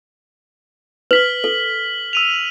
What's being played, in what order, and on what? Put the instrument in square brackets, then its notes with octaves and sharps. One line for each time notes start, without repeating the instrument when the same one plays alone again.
[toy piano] B4 [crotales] F6 B6 F#7
[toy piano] A4
[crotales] E6 D#7 F7